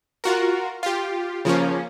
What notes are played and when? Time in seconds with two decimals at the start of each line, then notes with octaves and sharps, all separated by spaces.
0.24 F4 F#4 A#4
0.83 F4 G4
1.45 C#3 F3 A#3 C#4